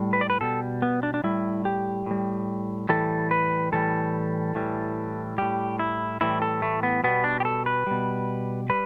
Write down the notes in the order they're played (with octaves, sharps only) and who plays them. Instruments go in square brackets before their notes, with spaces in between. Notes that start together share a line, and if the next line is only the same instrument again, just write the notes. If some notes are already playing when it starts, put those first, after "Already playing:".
Already playing: [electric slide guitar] A2 G3
B4
D5
B4
B2 G3 A4
B3
D4
D4
A2 G3 E4
G4
A2 G3
A2 E3 G3 A4
B4
A2 E3 G3 A4
A2 E3 G3
A2 G3 G4
E4
A2 E3 G3 E4
A4
A3
B3
B2 G3 B3
D4
G4
A4
B4
B2 G3
G3 B4